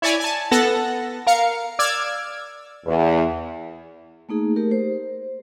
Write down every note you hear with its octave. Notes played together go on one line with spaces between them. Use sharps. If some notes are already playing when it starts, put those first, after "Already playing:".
E4 C#5 D5 G#5
G#5 A5
B3 A4 F#5 A5 A#6
A#4 F5 C#7
D5 D6 E6 F6 G#6
E2
A3 A#3 D#4 G#4
A3 G4 A#4
C5